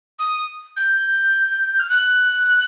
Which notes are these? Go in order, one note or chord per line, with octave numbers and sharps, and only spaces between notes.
D#6
G6
F6
F#6